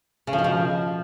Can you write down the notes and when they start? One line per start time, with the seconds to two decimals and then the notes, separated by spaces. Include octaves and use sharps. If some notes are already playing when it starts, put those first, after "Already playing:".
0.27 C#3
0.33 F3
0.39 B2
0.44 F3